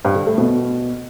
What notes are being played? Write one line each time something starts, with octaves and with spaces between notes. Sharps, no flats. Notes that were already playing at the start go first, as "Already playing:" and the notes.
G2
D3
A3
B2